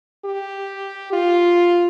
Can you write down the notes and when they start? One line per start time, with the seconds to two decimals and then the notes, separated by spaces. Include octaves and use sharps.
0.25 G4
1.13 F4